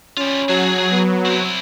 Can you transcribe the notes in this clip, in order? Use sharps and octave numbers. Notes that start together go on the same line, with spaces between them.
G3 C#4 F4
F#3 G#4 A5
B3
C4 E4